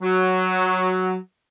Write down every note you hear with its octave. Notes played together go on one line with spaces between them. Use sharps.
F#3